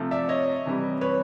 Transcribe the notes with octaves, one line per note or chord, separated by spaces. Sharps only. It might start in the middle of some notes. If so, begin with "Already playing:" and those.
Already playing: C3 F3 A3
D5 E5
C#5 D#5
C3 E3 G3
B4 C#5